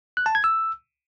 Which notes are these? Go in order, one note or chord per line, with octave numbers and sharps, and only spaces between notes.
F#6
A5
G#6
E6